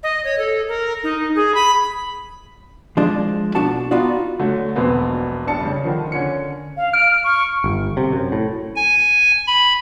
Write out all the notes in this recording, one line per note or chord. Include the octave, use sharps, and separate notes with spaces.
D#5
C#5
A4
A#4
D#4
G#4
B5
F3 G#3 D4
B1 D4 F#4 A5
B3 D#4 F4 F#4 D5
D3 F#3 A3
E1 A#1 B2 B3 C4
A1 D4 A5 C#7
G2 C#3
D3 D#3 F3
D3 C#4 C#7
F5
F6 D7
C#6
G1
C3
F#2
A2
G#5
B5